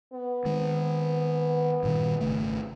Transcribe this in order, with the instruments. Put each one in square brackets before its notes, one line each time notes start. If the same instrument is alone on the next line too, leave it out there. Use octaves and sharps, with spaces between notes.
[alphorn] B3
[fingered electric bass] D#3 G#3
G2 A#2 D#3
G#1 C#3 A3